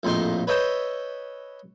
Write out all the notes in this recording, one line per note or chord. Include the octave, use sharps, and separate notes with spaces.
A#1 F2 A2 D#4 C6
B4 C#5 D#5 E5 G5 A5